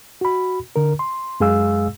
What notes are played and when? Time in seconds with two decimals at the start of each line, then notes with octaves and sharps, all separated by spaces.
0.21 F#4 B5
0.76 D3 A#4
0.99 C6
1.40 F#2 G#3 G#4 F5 E6